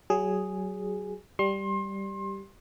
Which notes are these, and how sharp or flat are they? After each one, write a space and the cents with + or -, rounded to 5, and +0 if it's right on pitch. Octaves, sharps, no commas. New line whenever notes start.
F#3 +30 G#4 +0
G3 +0 C6 +30